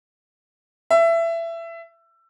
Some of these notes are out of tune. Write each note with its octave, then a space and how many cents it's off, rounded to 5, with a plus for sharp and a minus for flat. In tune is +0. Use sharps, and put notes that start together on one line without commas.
E5 +20